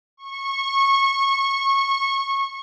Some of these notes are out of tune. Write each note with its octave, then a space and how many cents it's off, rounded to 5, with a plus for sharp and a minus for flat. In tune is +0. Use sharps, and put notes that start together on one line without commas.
C#6 -20